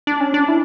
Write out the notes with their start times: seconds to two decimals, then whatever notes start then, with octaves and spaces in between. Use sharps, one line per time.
0.07 D4
0.20 C#4
0.34 D4
0.48 E4